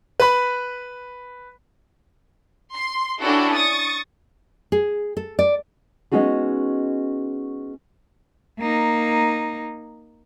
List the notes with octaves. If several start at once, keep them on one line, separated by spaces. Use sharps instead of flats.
B4 B5
C6
C#4 D4 E4 F#4 G4 A4
C#6 D#6 A6
G#4
A4
D5
G#3 B3 C#4 D#4 F#4 G#4
A#3 D#4